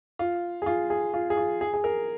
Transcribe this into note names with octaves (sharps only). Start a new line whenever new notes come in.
F4
G#4
F4
G#4
F4
G#4
F4
G#4
G#4
A#4